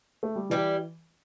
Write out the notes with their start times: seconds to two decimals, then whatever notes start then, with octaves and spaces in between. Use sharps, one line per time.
0.23 A3
0.36 G3
0.50 E3 G3 E4 G4